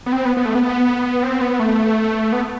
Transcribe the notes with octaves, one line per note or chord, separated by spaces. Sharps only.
B3
C4
B3
B3
A3
B3
C4
B3
A3
B3